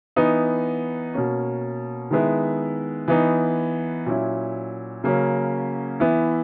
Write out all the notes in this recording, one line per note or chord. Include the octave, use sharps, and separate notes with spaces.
E3 B3 D#4
B2 A#3 C#4
D#3 G#3 B3 E4
E3 B3 D#4
A#2 F#3 C#4 E4
C#3 F#3 A#3 C#4
E3 B3 E4